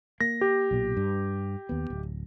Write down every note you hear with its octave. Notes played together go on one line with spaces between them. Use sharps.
A#3 A#6
G4
B1 A#2
G2
D#2 B3
D1